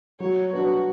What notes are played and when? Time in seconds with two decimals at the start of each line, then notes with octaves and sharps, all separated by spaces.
0.20 F#3 C#5
0.53 B3 D4 F#4